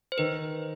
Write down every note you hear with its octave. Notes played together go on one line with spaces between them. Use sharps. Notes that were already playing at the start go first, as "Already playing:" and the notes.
C5
D#3 B4